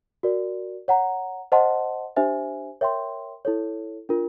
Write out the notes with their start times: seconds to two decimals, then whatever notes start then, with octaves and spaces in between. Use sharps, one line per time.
0.23 F#4 A#4 D5
0.88 C#5 F#5 A#5
1.52 C5 D#5 F#5 A5 C6
2.16 D4 G4 C5 E5 G#5
2.81 A#4 C#5 E5 G5 C6
3.45 E4 A4 C#5
4.09 D4 F4 A#4